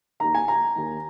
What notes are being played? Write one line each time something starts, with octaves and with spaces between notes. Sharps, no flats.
D#2 D#3 A#5
G#5
A#5
D#2 D#3